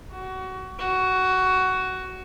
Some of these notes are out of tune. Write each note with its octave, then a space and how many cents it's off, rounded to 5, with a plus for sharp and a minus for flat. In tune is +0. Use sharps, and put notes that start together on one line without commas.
F#4 +25
F#4 +15